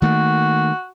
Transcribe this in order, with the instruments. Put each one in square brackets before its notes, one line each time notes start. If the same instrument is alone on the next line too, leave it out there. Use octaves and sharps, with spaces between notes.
[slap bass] D#3 A3 A#3 [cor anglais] F#4